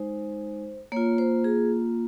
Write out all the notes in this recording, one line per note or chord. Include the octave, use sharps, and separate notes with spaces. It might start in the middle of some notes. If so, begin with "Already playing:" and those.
Already playing: G#3 D#4 C5
A#3 F4 C#5
C5
G#4